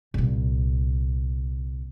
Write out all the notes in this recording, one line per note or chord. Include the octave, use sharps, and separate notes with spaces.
C2 A#2